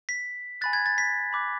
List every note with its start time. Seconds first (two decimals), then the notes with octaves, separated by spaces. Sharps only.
0.09 B6
0.61 G#5 B5 F#6 A6
0.73 G#6
0.86 A6
0.98 B6
1.33 B5 D6 F#6